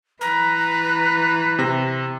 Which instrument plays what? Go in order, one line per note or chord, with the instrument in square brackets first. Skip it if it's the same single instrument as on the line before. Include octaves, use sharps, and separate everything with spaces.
[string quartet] E3 [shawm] B4 [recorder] A#5
[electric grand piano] C3 A#6